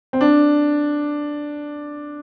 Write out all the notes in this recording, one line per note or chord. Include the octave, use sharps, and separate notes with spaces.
C4
D4